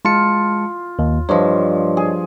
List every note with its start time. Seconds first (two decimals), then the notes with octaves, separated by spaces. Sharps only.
0.05 G#3 F4 A5 C#7
0.99 D#2
1.29 G2 F3 C#5 D#5
1.97 G#4